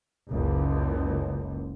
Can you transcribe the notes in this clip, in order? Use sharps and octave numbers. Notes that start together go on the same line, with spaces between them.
F#1 C#2